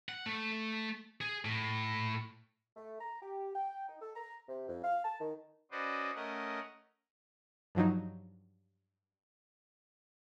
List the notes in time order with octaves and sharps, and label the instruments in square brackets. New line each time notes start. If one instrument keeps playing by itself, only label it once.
[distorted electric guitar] F#5
A3
G#4
A2
[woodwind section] A3
A#5
G4
G5
D#4
A4
A#5
C3
F2
F5
A5
D#3
[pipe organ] C#4 F#4 B4 C5 D5 D#5
A3 C#4 A#4 D#5 F#5
[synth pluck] G2 F3 F#3 D#4